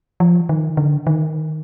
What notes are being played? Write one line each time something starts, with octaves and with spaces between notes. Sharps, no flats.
F3
D#3
D3
D#3